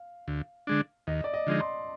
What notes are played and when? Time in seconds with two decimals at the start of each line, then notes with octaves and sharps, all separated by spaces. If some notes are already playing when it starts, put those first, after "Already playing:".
Already playing: F5
0.28 D2
0.67 D3 G#3 D4
1.07 D#2 D#5
1.24 D5
1.34 D#5
1.47 D3 F3 G#3 D#4
1.61 C6